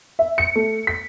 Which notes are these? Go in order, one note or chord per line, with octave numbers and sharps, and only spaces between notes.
E5
C#7
A3
B6